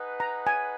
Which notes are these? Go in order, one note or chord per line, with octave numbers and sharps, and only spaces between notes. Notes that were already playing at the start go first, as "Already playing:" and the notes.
Already playing: D#4 G#4 B4 F#5
A#5
G#5